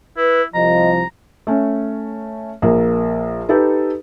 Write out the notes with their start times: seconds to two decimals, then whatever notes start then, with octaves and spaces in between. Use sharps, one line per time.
0.17 E4 B4
0.54 C2 F3 D#5 A#5
1.47 A3 C#4
2.62 A#1 A#3
3.49 D#4 G4 A4 B4